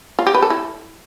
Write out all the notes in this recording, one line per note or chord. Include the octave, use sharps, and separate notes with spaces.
F4
G4
B4
A4
E4